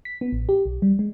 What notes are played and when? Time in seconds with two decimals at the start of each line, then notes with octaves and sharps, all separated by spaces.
0.05 B6
0.21 B3
0.32 A1
0.49 G4
0.65 B1
0.82 G3
0.99 G#3